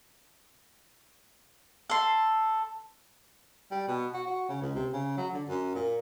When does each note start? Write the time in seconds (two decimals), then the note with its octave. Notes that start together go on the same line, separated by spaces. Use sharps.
1.90 A4 C6
3.71 G3
3.88 B2
4.14 F#4
4.27 F#4
4.49 C#3
4.61 C#2
4.75 C3
4.93 C#3
5.17 F#3
5.34 D3
5.49 F#2
5.75 A#2